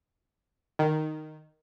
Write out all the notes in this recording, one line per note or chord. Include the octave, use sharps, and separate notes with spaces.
D#3